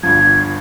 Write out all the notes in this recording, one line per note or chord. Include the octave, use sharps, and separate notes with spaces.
G1 G2 F3 G#6